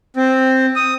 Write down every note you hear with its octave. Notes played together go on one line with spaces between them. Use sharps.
C4
D#6